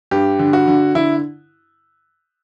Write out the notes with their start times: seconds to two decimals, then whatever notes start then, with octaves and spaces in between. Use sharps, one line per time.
0.11 G2 G4
0.39 D3
0.53 F#4
0.68 D3
0.95 D3 E4